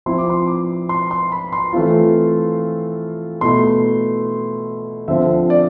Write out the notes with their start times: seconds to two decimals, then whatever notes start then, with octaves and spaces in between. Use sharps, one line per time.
0.06 F3 C4 E4 C6
0.18 D6
0.30 C6
0.47 D6
0.89 C6
1.11 C6
1.32 B5
1.53 C6
1.73 E3 A3 C4 F4
3.41 B2 A3 E4 C6
5.08 D3 F3 C4 F4 E5
5.50 D5